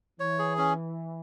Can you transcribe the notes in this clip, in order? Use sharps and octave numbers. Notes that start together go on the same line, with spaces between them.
E3 C#5
G#4
C#4